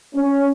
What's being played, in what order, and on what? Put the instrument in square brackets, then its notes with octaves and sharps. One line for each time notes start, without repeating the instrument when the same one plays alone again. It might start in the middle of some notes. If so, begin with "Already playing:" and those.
[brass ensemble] C#4